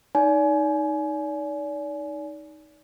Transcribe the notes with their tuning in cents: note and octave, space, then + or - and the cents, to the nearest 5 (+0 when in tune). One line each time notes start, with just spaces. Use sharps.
D#4 +0 D5 -35 G#5 +30